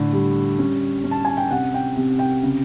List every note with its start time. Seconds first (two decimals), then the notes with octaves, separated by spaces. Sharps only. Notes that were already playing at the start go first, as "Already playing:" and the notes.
Already playing: A2 D3
0.13 G3
0.59 C#4
1.04 C#4
1.11 A5
1.25 G#5
1.37 G5
1.51 C3 F#5
1.74 G5
1.97 C3
2.19 G5
2.43 C#3